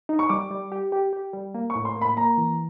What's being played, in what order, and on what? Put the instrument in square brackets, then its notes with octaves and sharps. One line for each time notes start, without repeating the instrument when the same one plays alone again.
[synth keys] D#4
[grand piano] C#6
[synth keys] G3 [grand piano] D6
[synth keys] G3
G4
G4
G4
G3
A#3
[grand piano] C#6
[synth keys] A2
[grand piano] C6
[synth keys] A#3
[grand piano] B5
[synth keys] A#3 [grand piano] A#5
[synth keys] E3